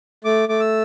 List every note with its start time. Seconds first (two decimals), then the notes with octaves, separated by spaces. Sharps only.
0.25 A3 D6
0.49 A3 D6
0.60 E6